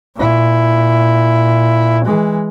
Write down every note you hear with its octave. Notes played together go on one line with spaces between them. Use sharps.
A#2 E4
E3 G#3